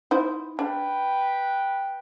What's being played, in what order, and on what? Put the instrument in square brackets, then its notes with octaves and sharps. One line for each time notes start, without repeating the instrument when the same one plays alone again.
[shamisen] D#4 E4 C5
[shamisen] D4 G#4 [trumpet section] B4 G5